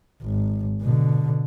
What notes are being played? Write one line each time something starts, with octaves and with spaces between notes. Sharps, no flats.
G#1
B2 D3